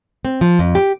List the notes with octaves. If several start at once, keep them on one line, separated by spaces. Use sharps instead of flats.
C4
F3
F2
G4